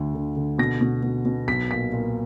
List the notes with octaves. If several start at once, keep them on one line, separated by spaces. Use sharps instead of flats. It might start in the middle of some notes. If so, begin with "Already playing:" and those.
Already playing: D2 D3
D3
D3
B2 A#6
B2
B2
B2
B1 B6
A#2 B6
A#2